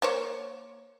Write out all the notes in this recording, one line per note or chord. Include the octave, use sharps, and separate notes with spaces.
A#3 C5 C#5